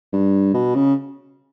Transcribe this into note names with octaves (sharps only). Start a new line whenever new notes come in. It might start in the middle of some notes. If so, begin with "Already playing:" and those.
G2
B2
C#3